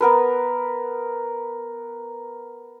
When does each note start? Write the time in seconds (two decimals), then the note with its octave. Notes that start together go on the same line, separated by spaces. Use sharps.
0.01 B3 A#4 B4